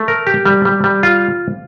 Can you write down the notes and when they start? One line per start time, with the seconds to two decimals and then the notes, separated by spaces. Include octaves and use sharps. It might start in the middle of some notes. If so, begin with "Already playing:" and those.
Already playing: A3
0.08 A#4
0.27 G4
0.45 G3
0.65 G3
0.84 G3
1.03 F4